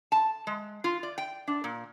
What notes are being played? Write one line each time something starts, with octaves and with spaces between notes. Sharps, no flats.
A5
G#3
F4
D5
G5
D4
A#2